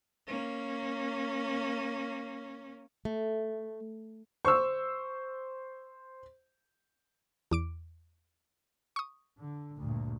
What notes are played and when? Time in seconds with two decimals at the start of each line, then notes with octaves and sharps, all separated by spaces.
0.27 A#3 C#4
3.05 A3
4.45 C5 C#6 E6
7.51 E2 D6 D7
8.96 C#6 D#6
9.41 D3
9.79 D2 G2 A#2